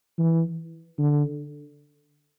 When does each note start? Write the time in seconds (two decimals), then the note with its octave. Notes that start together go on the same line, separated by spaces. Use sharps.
0.18 E3
0.98 D3